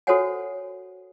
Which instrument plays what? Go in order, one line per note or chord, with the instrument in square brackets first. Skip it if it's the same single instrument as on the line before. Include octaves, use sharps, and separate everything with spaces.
[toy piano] F#4 A4 C5 C#5 F#5 G#5